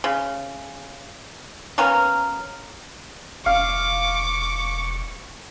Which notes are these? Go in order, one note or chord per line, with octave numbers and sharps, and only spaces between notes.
C#3
A#3 B3 C#4 A#4
E1 F5 C#6 D6